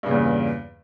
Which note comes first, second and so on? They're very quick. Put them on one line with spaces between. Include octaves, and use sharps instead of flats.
G2 C#3 A#2 E2